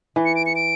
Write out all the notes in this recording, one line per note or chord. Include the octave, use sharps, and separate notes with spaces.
E3
C#7
D7
C#7
D7